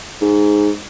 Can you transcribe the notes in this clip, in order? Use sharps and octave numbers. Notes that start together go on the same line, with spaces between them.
G#2